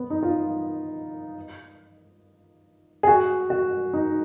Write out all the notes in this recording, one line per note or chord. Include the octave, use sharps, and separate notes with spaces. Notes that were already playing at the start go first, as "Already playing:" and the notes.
Already playing: B3
D#4
F4
G#4
F#4
F#4
D#4